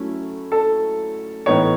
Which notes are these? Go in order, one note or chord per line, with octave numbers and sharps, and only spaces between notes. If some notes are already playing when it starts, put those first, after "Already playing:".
Already playing: F#3 A3 C#4 E4
A4
A2 E3 B3 D#4 C#5